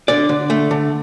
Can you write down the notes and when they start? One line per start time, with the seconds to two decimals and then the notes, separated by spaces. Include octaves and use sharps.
0.08 D3 D5
0.29 D3
0.50 A3
0.71 D3